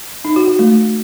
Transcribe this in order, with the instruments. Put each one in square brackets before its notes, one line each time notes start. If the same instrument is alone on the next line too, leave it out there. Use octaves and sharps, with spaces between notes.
[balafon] D#4
F#4
F#4
A3